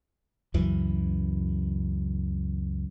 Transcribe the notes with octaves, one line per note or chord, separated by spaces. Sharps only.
C#2 F#2 E3